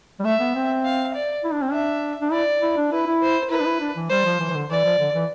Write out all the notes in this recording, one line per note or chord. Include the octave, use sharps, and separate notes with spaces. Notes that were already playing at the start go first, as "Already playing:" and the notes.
G3
A3 E5
B3
C4
F5
D5
E4
D4
C4
D4 E5
D4
E4 D5
E4
D4
E4 B4
E4
C5
E4 B4
D4
E4
D4
E3
G3 C5
F3
E3
E3
D3
E3 D5
F3
D3
E3